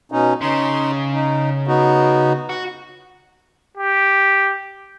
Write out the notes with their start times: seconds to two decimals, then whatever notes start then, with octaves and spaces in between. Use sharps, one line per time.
0.12 B2 C#4 D#4
0.41 C#3 D#4 C6
1.13 D#4
1.67 B3 D#4 F#4
2.49 F#4
3.77 G4